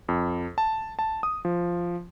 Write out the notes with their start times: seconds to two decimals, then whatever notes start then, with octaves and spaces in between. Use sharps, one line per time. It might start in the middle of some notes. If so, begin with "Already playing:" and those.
0.09 F2
0.58 A5
0.99 A5
1.23 D#6
1.45 F3